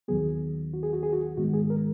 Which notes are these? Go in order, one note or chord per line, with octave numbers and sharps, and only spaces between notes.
D#2 D#3 F#3 B3 G#4
F#4
G#4
F#4
G#4
F#4
G#2 D#3 G#3 B3 F#4
G#4
A#4